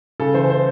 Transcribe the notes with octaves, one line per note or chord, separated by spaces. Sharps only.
C#3 A4
E3 C5
C5